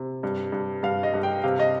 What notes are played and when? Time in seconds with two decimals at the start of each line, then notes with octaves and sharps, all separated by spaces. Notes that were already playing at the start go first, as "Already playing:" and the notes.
Already playing: C3
0.23 G2
0.52 G2
0.83 G2 F5
1.03 D#5
1.14 G2
1.23 G5
1.44 C3 F5
1.59 D#5